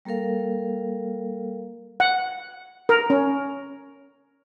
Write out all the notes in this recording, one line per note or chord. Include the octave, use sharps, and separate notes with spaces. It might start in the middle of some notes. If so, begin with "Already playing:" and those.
G3 A#3 A4 A#4 F5
F#5
A#4
C#4